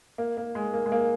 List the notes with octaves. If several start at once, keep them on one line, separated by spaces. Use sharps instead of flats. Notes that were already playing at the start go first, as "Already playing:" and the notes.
A#3
A#3
G#3
A#3
G#3
A#3